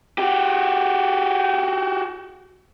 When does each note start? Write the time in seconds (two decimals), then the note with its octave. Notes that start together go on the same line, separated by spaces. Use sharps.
0.18 F#4 G4